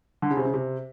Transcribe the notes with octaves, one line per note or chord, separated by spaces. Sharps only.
D3
C#3
C3
C#3
C3